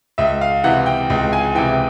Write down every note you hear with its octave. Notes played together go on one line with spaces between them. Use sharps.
C#2 E5
F5
C3 E3 F#5
G5
C#2
G#5
C3 E3 G5